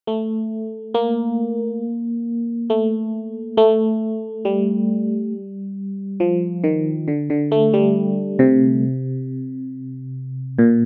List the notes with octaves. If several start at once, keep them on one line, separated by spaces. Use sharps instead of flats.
A3
A#3
A3
A3
G3
F3
D#3
D3
D3
A3
G3
C3
A#2